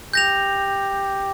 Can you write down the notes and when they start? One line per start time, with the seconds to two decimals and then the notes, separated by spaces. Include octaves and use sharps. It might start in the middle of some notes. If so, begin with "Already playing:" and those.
0.13 G4 G6 A#6 F7